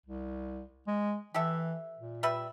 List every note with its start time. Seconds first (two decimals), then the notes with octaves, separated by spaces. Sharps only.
0.06 C2
0.87 G#3
1.34 E3 G4 A4 E5
1.99 A#2
2.23 G3 B4 E5